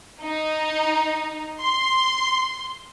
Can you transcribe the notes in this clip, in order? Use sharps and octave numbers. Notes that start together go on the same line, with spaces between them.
D#4
C6